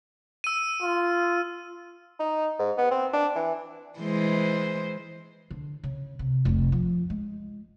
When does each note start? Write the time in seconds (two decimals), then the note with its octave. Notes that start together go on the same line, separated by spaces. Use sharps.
0.44 E6 D#7
0.83 F4
2.19 D#4
2.59 G#2
2.77 B3
2.91 C4
3.14 D4
3.35 E3
3.99 E3 G#3 C5
5.51 D3
5.84 C#3
6.19 C3
6.45 F1 C2
6.72 F3
7.10 G#3